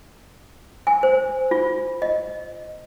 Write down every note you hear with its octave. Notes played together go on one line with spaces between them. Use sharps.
G#5
C5
F4
D#5